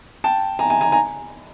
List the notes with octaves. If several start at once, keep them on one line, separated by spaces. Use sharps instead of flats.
G5 A5
G#5 A#5
G#5 A#5
G#5 A#5
G#5 A#5